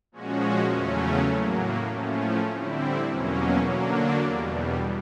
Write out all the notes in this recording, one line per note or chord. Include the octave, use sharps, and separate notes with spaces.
A#2 F3 G#3 C#4 F#4
E2 C#3 F#3 A3 C#4
A2 F#3 A#3
A2 F3 A3 C#4
D3 G3 C4 E4
E2 B2 F#3 A#3 C#4
D3 F#3 A#3 D4
E2 B2 G3